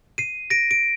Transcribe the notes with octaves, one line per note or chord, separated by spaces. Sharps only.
C7 D#7
A#6 D7
D7